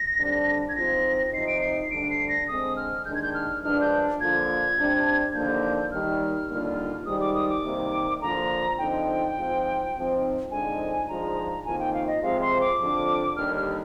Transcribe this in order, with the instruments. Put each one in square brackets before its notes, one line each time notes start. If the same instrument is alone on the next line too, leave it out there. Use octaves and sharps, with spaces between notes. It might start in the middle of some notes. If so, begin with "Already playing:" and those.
Already playing: [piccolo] A#6
[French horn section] F2 D3 G3 D4
[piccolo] G#6
[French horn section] G#2 F3 C4 F4 [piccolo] A#6
[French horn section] C3 F3 C4 D#4 [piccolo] C7
[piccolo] D7
C7
[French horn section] D2 D3 G3 D4 [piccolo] D7
[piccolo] C7
A#6
[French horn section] D3 G#3 C4 [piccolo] D#6
[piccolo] F6
[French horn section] D#2 D#3 G#3 D4 [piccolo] G6
[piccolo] G#6
G6
F6
[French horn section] G2 F3 G#3 D4 [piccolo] F6
[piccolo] G6
[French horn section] D3 F3 A#3 F4 [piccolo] G#6
[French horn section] C3 G3 D4
[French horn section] D#2 D3 F3 A#3 [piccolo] G6
[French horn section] D#2 D#3 G3 [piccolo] F6
[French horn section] D#2 D3 G3 A#3 F4
[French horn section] G#2 D#3 G3 [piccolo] D#6
[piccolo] D6
D#6
D6
[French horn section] C3 D#3 G3 A#3
[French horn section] D3 F3 A#3 F4 [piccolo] A#5
[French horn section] D3 F3 C4 D#4 [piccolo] G5
[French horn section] G#2 F3 C4 F4
G#2 F3 C4 D#4
[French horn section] F2 D3 F3 G#3 D#4 [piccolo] G#5
[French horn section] G#2 F3 G#3 D4 F4 [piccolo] A#5
[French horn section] F2 D#3 A#3 F4 [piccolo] G#5
[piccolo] G5
F5
D#5
[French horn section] C3 F3 G#3 C4 F4 [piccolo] F5
[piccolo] C6
D6
[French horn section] F2 D3 F3
[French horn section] D#2 D3 G3 [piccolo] F6
[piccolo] F6